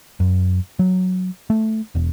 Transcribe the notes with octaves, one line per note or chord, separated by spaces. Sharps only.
F#2
F#3
A3
E1